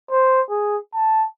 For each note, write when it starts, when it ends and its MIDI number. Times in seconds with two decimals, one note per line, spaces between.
0.11 0.41 72
0.50 0.77 68
0.94 1.26 81